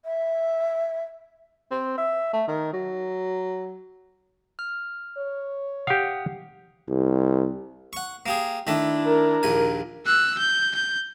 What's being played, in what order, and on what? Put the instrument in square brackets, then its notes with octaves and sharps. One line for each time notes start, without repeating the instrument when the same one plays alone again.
[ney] E5
[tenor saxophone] C4
E5
A3
D#3
F#3
[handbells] F6
[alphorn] C#5
[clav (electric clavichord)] G4 F5 [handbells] F#5 D#6
[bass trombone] C2
[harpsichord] F#5 C#6
A#3 G4 G#4
[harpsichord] D#3 A3 A4 [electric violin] D4 E4
[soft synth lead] A#4
[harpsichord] A#1 D#2 G#5
[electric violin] E6 F#6
G6
G6